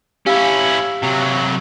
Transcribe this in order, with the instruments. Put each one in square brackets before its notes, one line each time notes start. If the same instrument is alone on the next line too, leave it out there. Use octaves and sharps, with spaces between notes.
[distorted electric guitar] C#4 E4 [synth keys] G4 F5 E6
[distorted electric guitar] C3 F#3